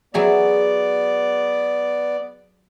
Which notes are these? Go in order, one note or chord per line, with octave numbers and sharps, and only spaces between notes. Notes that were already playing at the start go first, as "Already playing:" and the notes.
F#3 B3 G#4 D5 E5